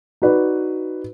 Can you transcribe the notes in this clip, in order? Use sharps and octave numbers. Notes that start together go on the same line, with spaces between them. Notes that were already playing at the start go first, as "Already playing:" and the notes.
D#4 F#4 B4 D5